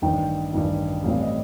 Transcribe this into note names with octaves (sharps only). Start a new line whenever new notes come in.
A1 G2 D#3 G5
A1 G2 D#3
A1 A2 G3 C4 F5
D#5